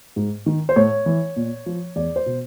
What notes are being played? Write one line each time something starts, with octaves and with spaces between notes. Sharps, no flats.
G#2
D#3
C5
A2 C#5
E3
A#2
F3
E2 D5
C5
B2